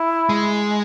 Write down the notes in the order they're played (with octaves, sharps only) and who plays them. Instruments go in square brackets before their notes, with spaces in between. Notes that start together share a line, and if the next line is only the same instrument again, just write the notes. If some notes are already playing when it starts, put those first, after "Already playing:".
Already playing: [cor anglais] E4
[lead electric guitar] G#3